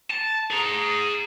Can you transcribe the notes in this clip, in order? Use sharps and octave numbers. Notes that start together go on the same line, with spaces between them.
A5
G#4 A#5